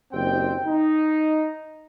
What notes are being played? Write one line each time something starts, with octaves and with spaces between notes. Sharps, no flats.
F#1 D#3 C4 G4 G5
D#4